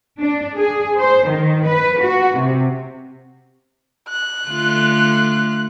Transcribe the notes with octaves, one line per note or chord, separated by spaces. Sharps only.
D4
G#4
C5
D#3
B4
F#4
C3
F#6
D3 A3 F4